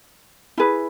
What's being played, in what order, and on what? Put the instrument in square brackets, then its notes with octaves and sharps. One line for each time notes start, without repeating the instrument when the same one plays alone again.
[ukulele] E4 G#4 B4